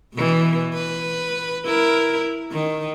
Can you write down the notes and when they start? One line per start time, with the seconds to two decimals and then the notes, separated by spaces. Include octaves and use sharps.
0.15 B2 E3
0.74 B4
1.66 E4 A#4
2.52 D#3